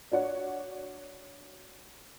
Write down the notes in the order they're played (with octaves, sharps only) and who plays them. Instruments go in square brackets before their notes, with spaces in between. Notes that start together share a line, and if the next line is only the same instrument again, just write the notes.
[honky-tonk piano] D4 F#4 C#5 F#5